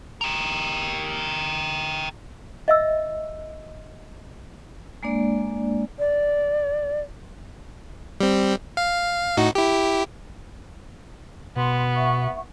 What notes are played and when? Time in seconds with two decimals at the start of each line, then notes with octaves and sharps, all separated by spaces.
0.21 G4 A#4
2.68 D#5 E5 E6
5.03 G#3 A#3 D4 D5
5.99 D5
8.20 G3 C4
8.77 F5
9.37 A2 D#4 F#4
9.55 E4 G4
11.56 B2 B3 C6
11.95 E5 F#5 C#6